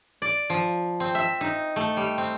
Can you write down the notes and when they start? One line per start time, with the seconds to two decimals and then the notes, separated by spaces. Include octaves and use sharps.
0.22 D5
0.50 F3
1.00 C4
1.15 E5
1.41 D#4
1.76 A3
1.97 G3
2.18 C4